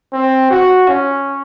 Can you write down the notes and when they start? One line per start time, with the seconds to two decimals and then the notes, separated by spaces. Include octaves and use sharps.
0.13 C4
0.50 F#4
0.88 C#4